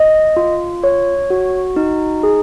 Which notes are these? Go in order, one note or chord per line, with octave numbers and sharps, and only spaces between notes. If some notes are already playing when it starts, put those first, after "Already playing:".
Already playing: D#5
F4
C#5
F#4
D#4
G#4